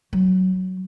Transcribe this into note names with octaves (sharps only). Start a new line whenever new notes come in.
F#3